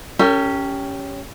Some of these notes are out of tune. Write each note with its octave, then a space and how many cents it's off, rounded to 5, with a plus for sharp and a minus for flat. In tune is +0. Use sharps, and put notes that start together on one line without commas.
C#4 +10 G4 +0 A#4 -45